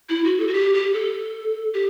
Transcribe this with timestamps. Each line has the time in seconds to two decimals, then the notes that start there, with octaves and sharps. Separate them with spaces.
0.09 E4
0.24 F#4
0.40 A4
0.47 F#4
0.53 G4
0.74 G4
0.93 A4
1.74 G4